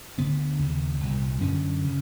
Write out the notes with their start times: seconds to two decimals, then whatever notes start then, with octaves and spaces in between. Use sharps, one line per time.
0.18 D2 D3 B3
0.59 D#2 C#3
1.00 C2 A#2
1.41 F#2 D3 C#4
1.84 C#3